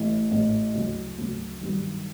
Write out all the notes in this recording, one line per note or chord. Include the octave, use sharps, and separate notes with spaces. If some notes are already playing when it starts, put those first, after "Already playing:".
Already playing: A1 A2 E3
A1 A2 E3
D2 C#3 F#3
D2 C#3 F#3
G2 D#3 F#3